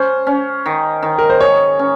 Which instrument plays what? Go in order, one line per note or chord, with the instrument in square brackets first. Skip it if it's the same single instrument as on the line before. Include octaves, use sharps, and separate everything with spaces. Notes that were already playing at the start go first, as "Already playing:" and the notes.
Already playing: [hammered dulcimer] C#4 [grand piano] C5
[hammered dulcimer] C#4
D#3
D#3
[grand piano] A#4
C5
[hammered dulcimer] G#4 [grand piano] C#5
[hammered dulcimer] C#4